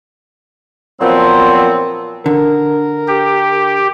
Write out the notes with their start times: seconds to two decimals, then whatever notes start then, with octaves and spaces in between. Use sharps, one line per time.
1.01 A#2 F3 F#3 B3 C4
2.26 D3 A#4
3.08 G4